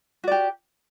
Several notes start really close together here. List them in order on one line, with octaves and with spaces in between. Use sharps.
F#4 D5 G4